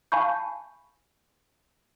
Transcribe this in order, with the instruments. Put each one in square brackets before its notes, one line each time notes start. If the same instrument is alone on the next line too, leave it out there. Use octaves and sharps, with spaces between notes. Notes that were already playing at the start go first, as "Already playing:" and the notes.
[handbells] F5 G#5 A5 B5 C#6 G6